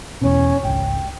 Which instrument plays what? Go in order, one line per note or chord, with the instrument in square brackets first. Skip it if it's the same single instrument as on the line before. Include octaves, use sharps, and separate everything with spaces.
[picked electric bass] E2 B2 [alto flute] C#4
[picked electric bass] G#1 C#2 [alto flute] G5